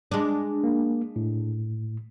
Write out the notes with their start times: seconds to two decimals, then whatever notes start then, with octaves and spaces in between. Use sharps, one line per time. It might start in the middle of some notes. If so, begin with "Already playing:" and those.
0.12 G#3 D4
0.64 A#3
1.16 A2